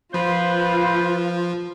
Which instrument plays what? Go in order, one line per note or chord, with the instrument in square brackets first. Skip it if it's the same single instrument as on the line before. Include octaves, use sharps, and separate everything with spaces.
[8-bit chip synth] F3 [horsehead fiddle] F4 [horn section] B4 C5